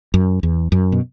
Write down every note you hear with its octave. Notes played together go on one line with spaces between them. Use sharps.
F#2
E2
F#2
B2